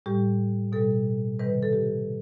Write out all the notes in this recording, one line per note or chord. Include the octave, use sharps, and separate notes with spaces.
A2 G3 G4
B2 G3 A4
C3 D#3 G3 B4
B4
A4
G4